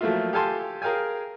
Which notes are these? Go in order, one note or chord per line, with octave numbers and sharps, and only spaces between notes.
F3 F#3 A3 A#3 E4 F4
G4 A4 F5 G#5 A5 C6
G#4 A#4 F5 G5 G#5